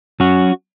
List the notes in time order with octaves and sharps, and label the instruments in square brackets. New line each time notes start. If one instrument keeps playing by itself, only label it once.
[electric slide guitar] F#3 C#4 F#4